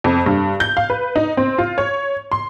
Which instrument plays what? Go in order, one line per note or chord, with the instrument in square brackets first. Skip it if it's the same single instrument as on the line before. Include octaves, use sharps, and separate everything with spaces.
[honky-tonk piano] F2
G2
G6
F5
B4
D#4
C4
F4
C#5
C6